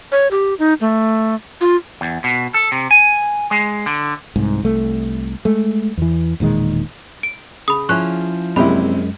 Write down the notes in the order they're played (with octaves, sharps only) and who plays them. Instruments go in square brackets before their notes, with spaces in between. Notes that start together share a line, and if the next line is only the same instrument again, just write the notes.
[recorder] C#5
G4
D#4
A3
F4
[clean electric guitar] E2
B2
A4
C3
G#5
G#3
D3
[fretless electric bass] C2 G#2
C2 A3
G#3 A3
E2 E3
E1 A#2 D#3 G#3
[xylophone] D7
[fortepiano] C#3 [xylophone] B5 D#6
[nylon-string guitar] F3 C#4 E4 [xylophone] C#6 F#6
[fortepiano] A#1 C3 E4 [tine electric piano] F#2 G#3 [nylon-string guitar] C4 [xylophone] B5